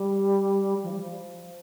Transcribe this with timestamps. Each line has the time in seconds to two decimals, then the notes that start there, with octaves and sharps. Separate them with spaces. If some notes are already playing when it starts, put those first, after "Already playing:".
Already playing: G3
0.82 F3
0.90 G3
1.00 F3